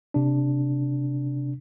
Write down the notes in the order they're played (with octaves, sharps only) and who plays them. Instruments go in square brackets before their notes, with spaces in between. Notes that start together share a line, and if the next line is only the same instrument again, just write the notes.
[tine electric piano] C3 D4